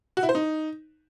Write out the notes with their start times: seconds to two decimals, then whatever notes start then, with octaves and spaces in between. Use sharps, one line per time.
0.17 F#4
0.23 E4
0.29 C5
0.35 D#4